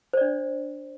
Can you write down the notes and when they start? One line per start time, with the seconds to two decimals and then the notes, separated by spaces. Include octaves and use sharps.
0.13 C5
0.17 D5
0.21 D4